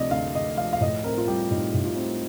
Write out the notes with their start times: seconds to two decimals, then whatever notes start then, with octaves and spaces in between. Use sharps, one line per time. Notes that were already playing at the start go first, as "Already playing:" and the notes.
Already playing: D2 C3 F3 D5 D#5
0.11 D2 F5
0.35 D2 D#5
0.57 F3 F5
0.73 F5
0.81 A2 D#5
1.04 C4 A#4
1.18 F4
1.27 G3 G4
1.51 A2 D#4
1.74 A2
1.85 F4
1.96 C4